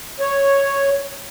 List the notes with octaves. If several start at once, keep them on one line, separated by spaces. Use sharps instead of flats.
C#5